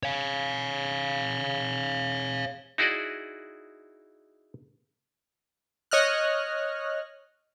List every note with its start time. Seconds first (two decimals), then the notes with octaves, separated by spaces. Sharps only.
0.03 C#5 F5
2.78 D#4 E4 F#4 G#4 D5 D#5
5.91 C#5 D#5 F6 F#6